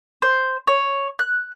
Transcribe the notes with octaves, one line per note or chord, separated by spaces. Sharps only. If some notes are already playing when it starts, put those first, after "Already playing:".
C5
C#5
F#6